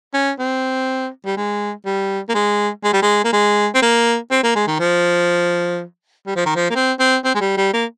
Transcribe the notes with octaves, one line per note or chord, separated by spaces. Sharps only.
C#4
C4
G3
G#3
G3
A#3
G#3
G#3
G3
G#3
A#3
G#3
C4
A#3
C4
A#3
G#3
D#3
F3
G3
F3
D#3
F3
A#3
C4
C4
C4
G#3
G3
G3
A#3